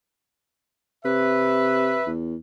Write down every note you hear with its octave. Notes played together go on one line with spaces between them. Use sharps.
C3 B4 E5
E2